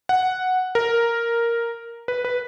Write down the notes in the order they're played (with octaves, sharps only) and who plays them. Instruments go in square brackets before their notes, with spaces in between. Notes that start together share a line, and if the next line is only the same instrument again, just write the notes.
[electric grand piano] F#5
A#4
B4
B4